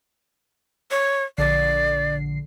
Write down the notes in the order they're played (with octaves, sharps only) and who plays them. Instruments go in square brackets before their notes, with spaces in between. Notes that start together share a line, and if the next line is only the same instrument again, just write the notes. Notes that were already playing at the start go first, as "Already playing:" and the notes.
[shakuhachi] C#5
[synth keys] A#1 D3 C7 [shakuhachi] D5